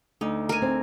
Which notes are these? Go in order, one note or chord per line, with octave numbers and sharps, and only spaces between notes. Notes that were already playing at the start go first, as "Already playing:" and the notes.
D2 D#4
A#4 G#5
C4